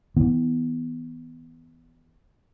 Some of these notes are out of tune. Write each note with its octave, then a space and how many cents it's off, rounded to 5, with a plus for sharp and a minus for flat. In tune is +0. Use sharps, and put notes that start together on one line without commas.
E3 -35 B3 +0